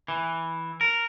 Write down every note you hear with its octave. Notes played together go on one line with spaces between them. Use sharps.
E3
A#4